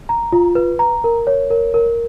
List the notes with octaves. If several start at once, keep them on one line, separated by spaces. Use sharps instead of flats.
A#5
F4
B4
A#5
A#4
C#5
A#4
A#4